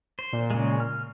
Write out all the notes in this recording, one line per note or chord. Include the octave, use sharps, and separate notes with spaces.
C5
A#2
C#3 G#3
F6